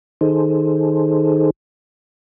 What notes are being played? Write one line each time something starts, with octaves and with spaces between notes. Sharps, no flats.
D#3 D#4 G#4 A4 C5